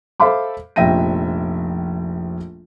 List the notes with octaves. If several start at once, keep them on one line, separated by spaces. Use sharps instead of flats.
A4 C5 E5 F5 B5 D6
F1 A#1 E5 G5 A#6 D#7